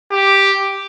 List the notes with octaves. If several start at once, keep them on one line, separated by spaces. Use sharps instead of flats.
G4